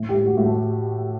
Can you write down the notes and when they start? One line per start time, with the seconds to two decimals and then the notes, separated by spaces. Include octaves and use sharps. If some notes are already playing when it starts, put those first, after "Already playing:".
Already playing: A2
0.09 G4
0.15 A2
0.26 F#4
0.37 A2
0.44 A3